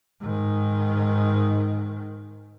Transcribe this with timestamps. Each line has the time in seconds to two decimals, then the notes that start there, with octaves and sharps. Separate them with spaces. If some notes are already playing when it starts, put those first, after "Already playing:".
0.21 G#2 D#3